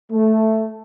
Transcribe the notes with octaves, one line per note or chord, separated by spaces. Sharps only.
A3